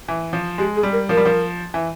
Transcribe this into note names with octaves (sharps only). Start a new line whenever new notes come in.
E3
F3
G#3 G4
G#4
G3
A#4
F3 A#4
G3
F3
E3